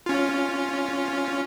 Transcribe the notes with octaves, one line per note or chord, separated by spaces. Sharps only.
C#4 F4